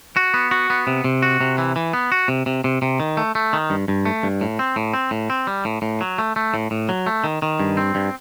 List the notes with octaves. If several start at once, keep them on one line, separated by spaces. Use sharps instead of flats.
F#4
B3
F#4
B3
C3
C3
F#4
C3
E3
E3
B3
F#4
C3
C3
C3
C3
D#3
A3
A3
D#3
G2
G2
A3
G2
A2
C4
A2
C4
A2
C4
G3
A2
A2
F#3
A3
A3
A2
A2
F#3
A3
D#3
D#3
G2
C4
G2